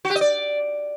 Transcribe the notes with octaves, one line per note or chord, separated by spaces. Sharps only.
F#4
G4
D#5
D5